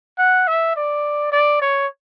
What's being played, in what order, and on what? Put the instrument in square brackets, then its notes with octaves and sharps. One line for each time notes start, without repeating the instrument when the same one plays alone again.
[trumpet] F#5
E5
D5
D5
C#5